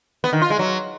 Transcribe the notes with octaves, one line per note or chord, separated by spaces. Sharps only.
B3
D#3
F4
G#3
F#3